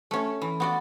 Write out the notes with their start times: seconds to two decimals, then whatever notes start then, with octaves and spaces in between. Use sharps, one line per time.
0.11 A3 C#4
0.42 E3
0.60 B3 F#4 D5